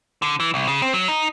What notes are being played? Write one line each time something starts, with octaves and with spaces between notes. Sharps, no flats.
D3
E3
C2
C#3
C4
F#3
D#4